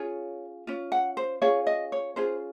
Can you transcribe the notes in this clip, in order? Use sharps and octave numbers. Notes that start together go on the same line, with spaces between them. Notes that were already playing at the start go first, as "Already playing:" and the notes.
Already playing: C#4 F4 G#4 C#5
C#4 F4
F#5
C5
C#4 F4 G#4 C#5
D#5
C#5
C#4 F4 G#4 C5